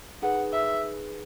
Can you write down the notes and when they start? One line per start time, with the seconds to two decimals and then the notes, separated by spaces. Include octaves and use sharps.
0.22 D#4 G#4 B4 F#5
0.53 E5